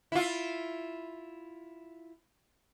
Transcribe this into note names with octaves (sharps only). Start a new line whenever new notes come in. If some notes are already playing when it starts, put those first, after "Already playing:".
E4 F4